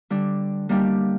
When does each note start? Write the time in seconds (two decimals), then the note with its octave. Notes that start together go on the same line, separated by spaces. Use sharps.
0.10 D3 G3 D4
0.69 G3 A#3 D4 G4